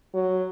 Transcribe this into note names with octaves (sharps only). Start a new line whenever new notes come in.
F#3